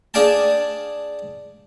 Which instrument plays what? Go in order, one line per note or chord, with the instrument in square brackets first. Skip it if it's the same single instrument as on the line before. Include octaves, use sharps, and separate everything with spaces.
[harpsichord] D4 G#4 D5 F5 G5 A5